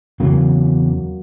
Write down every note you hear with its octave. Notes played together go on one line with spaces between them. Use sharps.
E2 C#3 F#3 A#3